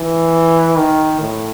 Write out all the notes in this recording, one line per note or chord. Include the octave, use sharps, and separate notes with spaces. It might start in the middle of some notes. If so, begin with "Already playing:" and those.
Already playing: E3
D#3
A2